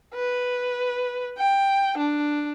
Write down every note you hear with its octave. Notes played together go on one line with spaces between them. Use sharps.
B4
G5
D4